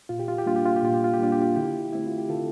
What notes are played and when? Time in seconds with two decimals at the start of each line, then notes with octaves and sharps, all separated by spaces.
0.09 A#2 F4
0.19 G4
0.28 F4
0.38 G4
0.46 G3 A#3 D4 F4
0.56 G4
0.65 F4
0.76 G4
0.83 A#2 F4
0.94 G4
1.04 F4
1.13 G4
1.19 G3 A#3 D4 F4
1.32 G4
1.41 F4
1.56 D3 E4 G4
1.93 A3 C4 E4
2.07 F4
2.18 G4
2.29 D3 F4 A4